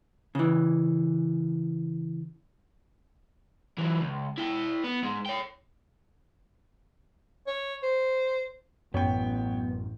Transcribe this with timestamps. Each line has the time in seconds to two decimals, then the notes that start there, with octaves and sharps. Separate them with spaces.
0.35 C#3 E3
3.78 E3 F#3
4.01 C#2
4.38 E4 G5
4.84 B3
5.03 G#2 G#3
5.26 C#5 G5
7.47 C#5
7.83 C5
8.94 A1 F#2 B3 C#5 G5